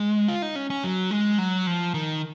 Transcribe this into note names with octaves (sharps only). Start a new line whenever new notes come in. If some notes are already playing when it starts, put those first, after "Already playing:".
Already playing: G#3
F4
D#4
C#4
C#4
F#3
G#3
F#3
F3
D#3